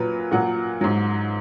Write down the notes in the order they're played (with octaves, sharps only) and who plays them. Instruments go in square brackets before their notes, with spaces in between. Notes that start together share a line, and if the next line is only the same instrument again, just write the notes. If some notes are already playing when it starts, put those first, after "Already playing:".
Already playing: [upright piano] A#2 F#3 B4
A#2 F#3 F#5
G#2 F#3